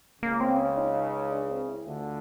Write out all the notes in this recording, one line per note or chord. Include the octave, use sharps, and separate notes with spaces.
C#2 C#3 A#3
C4
C#4
D#4
D4
C4
E4
D2 D3 F4